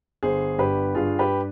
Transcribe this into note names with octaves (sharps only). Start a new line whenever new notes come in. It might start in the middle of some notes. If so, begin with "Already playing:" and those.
G1 G#4 C5
G2 G4 B4
G2 F4 G#4
G4 B4